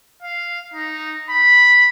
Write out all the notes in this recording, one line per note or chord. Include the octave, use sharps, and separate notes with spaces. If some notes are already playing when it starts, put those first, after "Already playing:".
F5
D#4
B5